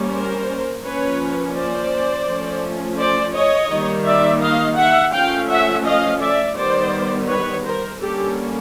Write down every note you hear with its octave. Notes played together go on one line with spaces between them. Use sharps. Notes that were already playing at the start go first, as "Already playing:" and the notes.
Already playing: G3 A#3 C#4
A#4 C5
F3 A#3 C#4 B4 C#5
C5 D5
F3 A3 C#4
C5 D5
C#5 D#5
D#3 G3 A#3
D5 E5
D#5 F5
E5 F#5
F3 A3 C#4 F5 G5
E5 F#5
D#5 F5
D5 E5
D#3 G3 B3 C5 D5
B4 C#5
A#4 C5
D3 G3 A#3 C#4 G4 A4